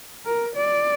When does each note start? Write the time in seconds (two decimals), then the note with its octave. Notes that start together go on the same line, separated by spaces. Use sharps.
0.26 A#4
0.56 D5